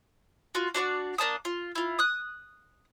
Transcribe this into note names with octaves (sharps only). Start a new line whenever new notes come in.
F4 F#4
D4 F#4 C5 D5
A#3 D4 A5 D#6
F4
E4 F4
D#6 F#6